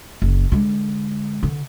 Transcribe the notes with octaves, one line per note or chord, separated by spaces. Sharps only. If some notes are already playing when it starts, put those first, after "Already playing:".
F#1
D3 G#3
D3